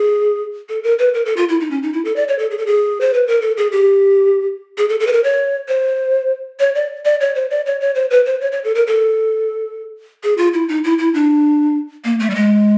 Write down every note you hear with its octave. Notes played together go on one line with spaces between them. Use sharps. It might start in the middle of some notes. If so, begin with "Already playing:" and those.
Already playing: G#4
A4
A#4
B4
A#4
A4
F4
E4
D#4
C#4
D#4
E4
A4
D5
C#5
A4
G#4
A4
G#4
C5
B4
A#4
A4
G#4
G4
G#4
A4
A4
B4
A#4
C#5
C5
C#5
D5
D5
C#5
C5
D5
C#5
C#5
C5
B4
C5
C#5
C#5
A4
A#4
A4
G#4
F4
E4
D#4
E4
E4
D4
A#3
A3
G3
G#3